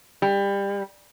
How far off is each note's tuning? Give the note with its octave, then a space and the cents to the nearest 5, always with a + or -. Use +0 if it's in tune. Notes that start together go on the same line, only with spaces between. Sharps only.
G3 +25